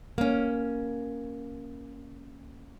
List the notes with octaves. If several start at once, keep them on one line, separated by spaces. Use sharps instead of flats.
A#3 C#4